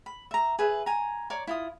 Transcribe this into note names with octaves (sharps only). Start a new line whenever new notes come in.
B5
E5 A#5
G#4 B4 E5
G#5 A#5
C#5 D5 A#5 D6
E4 F4 D#6